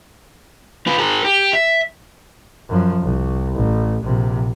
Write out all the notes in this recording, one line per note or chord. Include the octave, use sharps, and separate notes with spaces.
F4 B4
G#4 A#4
G4
E5
F#2 F3
C2
A1
A#1 C3